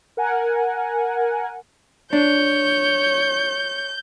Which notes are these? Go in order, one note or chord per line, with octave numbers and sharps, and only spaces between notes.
A#4 F#5 G#5
D4 C#5 G6